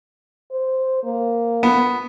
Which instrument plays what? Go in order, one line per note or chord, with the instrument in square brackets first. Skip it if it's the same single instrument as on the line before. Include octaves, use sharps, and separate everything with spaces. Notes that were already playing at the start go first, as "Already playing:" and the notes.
[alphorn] C5
A#3
[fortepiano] B3